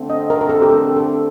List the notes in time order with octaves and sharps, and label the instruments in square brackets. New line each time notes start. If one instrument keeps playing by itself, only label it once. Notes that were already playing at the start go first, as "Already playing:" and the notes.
Already playing: [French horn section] D3 A3 C4
[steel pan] D#5
A#4
A#4
A4
G4
A4
A4